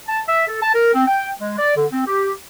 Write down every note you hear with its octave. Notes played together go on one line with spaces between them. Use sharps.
A5
E5
A4
A5
A#4
C4
G5
G#3
D5
D3
C4
G4